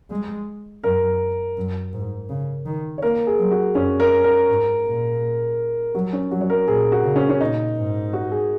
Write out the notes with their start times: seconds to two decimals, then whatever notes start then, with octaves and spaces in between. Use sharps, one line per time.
0.10 G#3
0.84 F#2 A#4
1.57 F#2
1.93 G#2
2.29 C#3
2.66 D#3
2.98 C#5
3.02 A#3 A#4
3.27 G#4
3.39 F#3
3.51 F#4
3.75 F#2 C#4
4.00 A#4
4.24 A#4
4.49 G#2
4.85 A#2
5.95 F#3 F#4
6.13 C#4
6.31 F#3 F#4
6.41 C#5
6.50 A#4
6.67 A#2 G#4
6.92 F#4
7.04 C#3
7.16 C#4
7.29 C#4
7.41 A#2 D#4
7.77 G#2
8.13 F#4
8.32 G#4